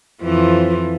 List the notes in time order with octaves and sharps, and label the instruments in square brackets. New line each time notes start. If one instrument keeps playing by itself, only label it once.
[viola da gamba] F2 E3 F3